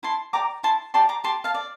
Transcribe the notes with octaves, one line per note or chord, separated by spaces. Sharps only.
E4 A5 C6
G4 D5 A#5 D6
E4 A5 C6
G4 D5 A5 C6
A#5 D6
G4 A5 C6
F5 A5
D5